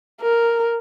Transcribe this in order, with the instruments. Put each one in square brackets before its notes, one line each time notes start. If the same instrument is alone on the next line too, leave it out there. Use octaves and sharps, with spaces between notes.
[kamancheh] A#4